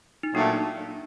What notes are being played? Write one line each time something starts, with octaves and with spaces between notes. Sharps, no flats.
D#4
A#2 F#3 A3 D4